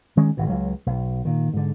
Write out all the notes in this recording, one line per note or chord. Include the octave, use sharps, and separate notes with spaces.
D#3 G#3 C#4
G#1 B2
C#2 F#3
B1
A#2 D#3
G#2 D3